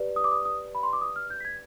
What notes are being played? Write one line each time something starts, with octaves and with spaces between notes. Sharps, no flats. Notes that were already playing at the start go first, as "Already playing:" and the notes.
Already playing: G4 B4 D5
D#6
D6
D#6
D#6
B5
C6
D6
D#6
F6
G6
B6
G#6